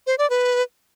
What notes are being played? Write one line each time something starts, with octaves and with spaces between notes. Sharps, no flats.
C5
D5
B4